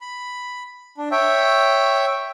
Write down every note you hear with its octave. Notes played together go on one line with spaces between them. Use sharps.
B5
D4
C#5 E5 G5